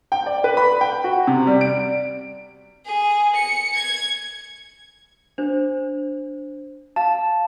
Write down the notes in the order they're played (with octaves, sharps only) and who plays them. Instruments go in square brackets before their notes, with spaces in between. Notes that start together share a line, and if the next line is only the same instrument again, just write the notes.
[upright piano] G5
D5
B4
B5
G5
F#4
C3
G3
D7
[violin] G#4
C#7
G#6
[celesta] D4 C5
[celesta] F5 [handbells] A5